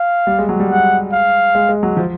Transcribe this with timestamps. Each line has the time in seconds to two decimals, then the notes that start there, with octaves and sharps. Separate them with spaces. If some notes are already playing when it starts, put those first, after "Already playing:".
Already playing: F5
0.27 G3
0.39 G#3
0.49 F#3
0.60 G3
0.70 G#3 F#5
1.13 F5
1.55 G#3
1.69 G#3
1.83 F#3
1.97 F3